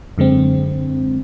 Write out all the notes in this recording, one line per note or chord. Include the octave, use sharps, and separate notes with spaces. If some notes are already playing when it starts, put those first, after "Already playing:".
F#2 D3 G#3 C4